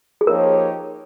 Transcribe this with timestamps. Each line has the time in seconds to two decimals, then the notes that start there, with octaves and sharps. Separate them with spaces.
0.21 G#4
0.27 F3 A#3 D#4 G4 A#4 C#5